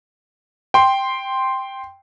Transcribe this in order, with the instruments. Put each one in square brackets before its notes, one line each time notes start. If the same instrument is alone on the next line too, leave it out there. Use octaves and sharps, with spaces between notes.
[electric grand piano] G5 C6